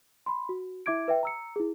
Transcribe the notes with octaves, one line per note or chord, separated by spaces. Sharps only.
B5 C6
F#4
E4 E5 D6 G#6 D7
B4 E5 G5
A#5 E6 C#7
E4 G#4